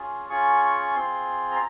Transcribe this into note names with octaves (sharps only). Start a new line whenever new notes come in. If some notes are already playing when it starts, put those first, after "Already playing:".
Already playing: C#4 F4 G#4
C#4 F4 G#4 C#6
C#6
C4 F4 G#4 C6
A#5